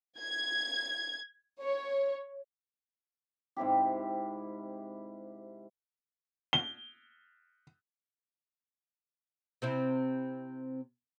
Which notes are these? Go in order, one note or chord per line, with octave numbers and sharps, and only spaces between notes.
G#6
C#5
G#2 C3 E4 G4
G7
C3 C4 E4